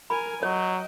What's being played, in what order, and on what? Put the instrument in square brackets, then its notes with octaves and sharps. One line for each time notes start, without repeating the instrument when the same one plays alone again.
[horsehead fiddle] A#4 G#5 [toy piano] B5
[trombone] F#3 [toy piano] C#5 [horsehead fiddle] D#5 G5